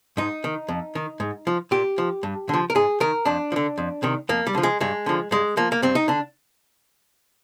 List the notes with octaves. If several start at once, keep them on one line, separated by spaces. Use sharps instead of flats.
G#2 D#4
D#3
F2
D#3
G#2
F3
A#2 G4
F3
G2
D3 F3
A#4
G#2 G#4
D#3 A#4
F2 D4
F3
D3
F2
C3 D#3
F2 A#3
G3
D3 F3
G#3
G2 G#3
D3 F3
G2 G#3
F3 A#3
A#3
G2 C4
D#4
D3 D4